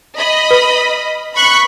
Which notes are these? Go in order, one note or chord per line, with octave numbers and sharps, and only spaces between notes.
D#5 B5
B4
B5 C#6 F#6